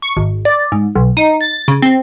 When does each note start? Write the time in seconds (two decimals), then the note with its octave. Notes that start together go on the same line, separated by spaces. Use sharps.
0.02 C#6
0.17 G#1
0.45 D5
0.72 G#2
0.95 B1
1.17 D#4
1.41 A6
1.68 C#3
1.82 C4